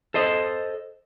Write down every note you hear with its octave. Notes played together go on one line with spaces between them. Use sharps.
A4 C5 D#5